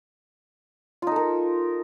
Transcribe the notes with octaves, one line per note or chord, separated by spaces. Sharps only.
D#4 F4 A4 A#4